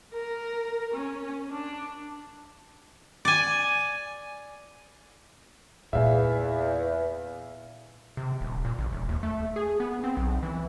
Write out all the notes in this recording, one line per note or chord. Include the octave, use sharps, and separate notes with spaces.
A#4
C#4
D4
D5 G#5
E2 A#2 F4 E5 F5 G#5
C3
D#1
A#2
A1
E1
D#2
A3
G#4
B3
C4
B1
E3